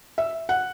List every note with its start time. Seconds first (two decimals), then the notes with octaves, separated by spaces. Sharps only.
0.18 E5
0.49 F#5